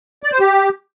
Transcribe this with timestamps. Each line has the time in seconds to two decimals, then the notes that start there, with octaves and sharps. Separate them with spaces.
0.23 D5
0.32 C5
0.40 G4